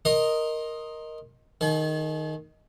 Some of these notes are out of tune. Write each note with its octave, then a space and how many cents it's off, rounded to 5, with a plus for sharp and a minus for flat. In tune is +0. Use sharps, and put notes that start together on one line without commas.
A#4 +0 D#5 +0 C6 +30
D#3 +0 G#4 +45